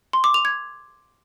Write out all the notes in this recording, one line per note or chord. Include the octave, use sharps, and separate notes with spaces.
C6
D6
F7
G#6